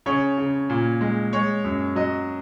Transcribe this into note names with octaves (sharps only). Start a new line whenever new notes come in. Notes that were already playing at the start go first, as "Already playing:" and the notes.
C#3 C#5
C#3
A#2
G#3
G#3 C#5
F#2
F#3 D#5